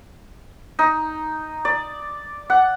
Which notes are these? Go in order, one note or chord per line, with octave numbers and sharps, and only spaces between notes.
D#4
D5
F#5